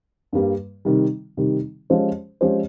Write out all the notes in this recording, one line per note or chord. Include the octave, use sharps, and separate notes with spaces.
G2 G3 A#3
C3 D#3 G3
C3 D#3 G3
F3 G#3 C#4 G4 C5
F3 G#3 C#4 G4 C5